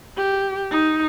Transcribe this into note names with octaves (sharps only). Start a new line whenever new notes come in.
G4
D#4